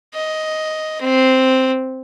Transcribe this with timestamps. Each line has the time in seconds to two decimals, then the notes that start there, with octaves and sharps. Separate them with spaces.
0.14 D#5
1.01 C4